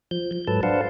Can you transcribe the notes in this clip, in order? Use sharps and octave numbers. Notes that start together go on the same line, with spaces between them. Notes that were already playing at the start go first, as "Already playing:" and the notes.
F3 G6
G6
G#2 F#3 A4 B4 A5
D4 B4 C5 F5 F#5 A5